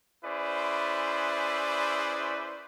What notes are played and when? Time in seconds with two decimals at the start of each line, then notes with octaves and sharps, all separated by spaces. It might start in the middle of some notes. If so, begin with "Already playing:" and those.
0.23 C#4 E4 G#4 B4 C5 D5